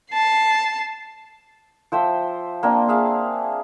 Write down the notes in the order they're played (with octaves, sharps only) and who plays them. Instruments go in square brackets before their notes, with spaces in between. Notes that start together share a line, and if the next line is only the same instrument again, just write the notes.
[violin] A5 C7
[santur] F3 C5 E5 G5
A#3 C4 D4
G#4 E5 F5